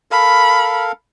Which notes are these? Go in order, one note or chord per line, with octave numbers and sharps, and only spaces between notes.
A4 A#4 F5 B5